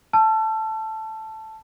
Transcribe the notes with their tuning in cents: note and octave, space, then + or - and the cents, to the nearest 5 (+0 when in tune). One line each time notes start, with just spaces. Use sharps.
A5 +0 E6 +40